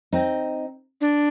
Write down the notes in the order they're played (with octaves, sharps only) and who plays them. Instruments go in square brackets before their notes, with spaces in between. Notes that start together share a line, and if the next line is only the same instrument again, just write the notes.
[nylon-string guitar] C4 D#4
[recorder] D4